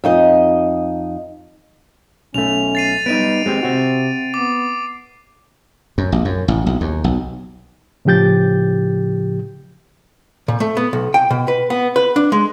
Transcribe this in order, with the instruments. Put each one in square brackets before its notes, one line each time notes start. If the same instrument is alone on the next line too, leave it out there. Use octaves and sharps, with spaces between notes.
[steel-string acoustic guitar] F2 D#4 D#5
[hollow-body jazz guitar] B1 A3 [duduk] C#4 [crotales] F7
[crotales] A6 C7 D#7
[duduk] G3 [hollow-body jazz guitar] B3 D4 D#4 [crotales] D7 D#7
[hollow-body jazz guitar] G#3 C4 G4
[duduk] C3 [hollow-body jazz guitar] C4 F#4
[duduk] B3 [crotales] D6
[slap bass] F#2
A#1
F#2
A1
B1
D#2
B1
[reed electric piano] A2 C#3 F3 G4 G6 A6
[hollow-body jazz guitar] A#2
A3
B3
B1
G5
B2
B4
B3
B4
D4
G#3